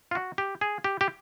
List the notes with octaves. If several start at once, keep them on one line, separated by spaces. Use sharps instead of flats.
F4
F#4
G4
G#4
G4
G4